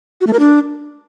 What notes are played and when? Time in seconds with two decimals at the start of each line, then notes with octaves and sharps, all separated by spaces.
0.21 F#4
0.27 A3
0.33 A#4
0.39 D4